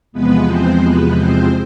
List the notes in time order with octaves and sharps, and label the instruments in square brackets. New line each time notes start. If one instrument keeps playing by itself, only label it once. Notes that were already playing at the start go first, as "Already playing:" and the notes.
[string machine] E2 C3 F3 G#3 B3 B4
C4 C5
B3 B4
C4 C5